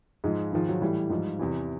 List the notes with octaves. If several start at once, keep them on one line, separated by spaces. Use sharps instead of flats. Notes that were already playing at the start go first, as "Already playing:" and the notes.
G#2 F3 G#3
G#2 D#3 F3
F#3
A2 E3 G3
G#2 F3
E2 C3 E3